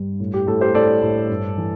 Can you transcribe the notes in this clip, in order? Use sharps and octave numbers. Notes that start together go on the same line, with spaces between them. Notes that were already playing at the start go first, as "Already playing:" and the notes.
Already playing: G2 G3
A2
G4
A2 A4
G4 C5
A2 A4 D5
A2
G2
E3